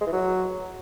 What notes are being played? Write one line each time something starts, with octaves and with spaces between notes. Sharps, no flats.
G#3
E3
F#3